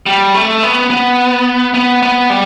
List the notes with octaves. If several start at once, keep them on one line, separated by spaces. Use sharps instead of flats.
G3
A3
B3
B3
B3
B3
G3